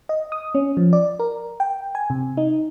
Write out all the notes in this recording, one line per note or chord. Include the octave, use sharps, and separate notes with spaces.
D#5
D#6
C#4
F3
D5
A#4
G5
G#5
C3
D#4